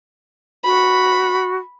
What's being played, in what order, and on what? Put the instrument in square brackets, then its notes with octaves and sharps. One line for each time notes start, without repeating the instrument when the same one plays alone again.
[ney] F#4 [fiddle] B5